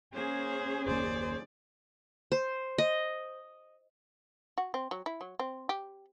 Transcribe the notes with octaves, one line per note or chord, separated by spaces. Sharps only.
A#3 C#4 G#4 C5
F#1 D#2 A#3 C5 D5
C5
D#5
F#4
C4
F#3
E4
F#3
C4
G4